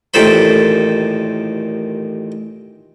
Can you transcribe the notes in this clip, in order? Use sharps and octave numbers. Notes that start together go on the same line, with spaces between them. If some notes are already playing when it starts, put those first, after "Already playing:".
A1 D#2 A#2 A4 C5 B5